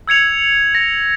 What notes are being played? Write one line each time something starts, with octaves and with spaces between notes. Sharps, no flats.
E6 G#6 C#7 F7
A#6